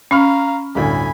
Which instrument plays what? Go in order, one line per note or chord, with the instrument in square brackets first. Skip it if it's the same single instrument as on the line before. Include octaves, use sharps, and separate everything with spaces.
[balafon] C#4 [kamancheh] F5 A#5 [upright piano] B5 C#6 F6
[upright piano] G1 D2 A2 [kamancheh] G#5 B5